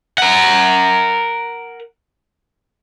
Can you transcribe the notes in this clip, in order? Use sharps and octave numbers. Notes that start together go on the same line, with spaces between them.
A#4 F#5